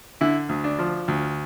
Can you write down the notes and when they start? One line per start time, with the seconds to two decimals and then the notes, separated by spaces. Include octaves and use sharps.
0.21 D3 E4
0.49 D2
0.64 D4
0.79 F3
1.08 D2